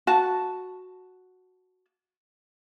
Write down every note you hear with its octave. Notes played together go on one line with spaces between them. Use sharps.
F#4 A5